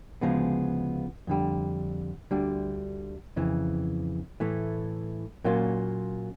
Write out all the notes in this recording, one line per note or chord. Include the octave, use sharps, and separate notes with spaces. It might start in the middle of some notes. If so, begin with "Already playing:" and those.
D2 C#3 F3 G#3 B3
F2 D3 G3
D2 D3 G3
F2 C#3 E3
A2 E3 A3
A#2 F#3 A#3 C#4 F4